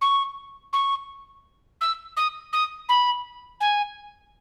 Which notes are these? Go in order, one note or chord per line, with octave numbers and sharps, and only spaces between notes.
C#6
C#6
E6
D#6
D#6
B5
G#5